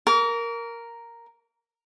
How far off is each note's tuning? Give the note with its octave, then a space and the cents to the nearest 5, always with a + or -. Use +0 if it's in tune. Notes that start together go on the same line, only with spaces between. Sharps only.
A#4 +0 D6 -45